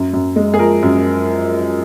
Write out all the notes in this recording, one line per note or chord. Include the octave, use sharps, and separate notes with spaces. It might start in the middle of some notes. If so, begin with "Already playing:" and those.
Already playing: F#2
F#2
G#3
G#4
F3 A#4
F#2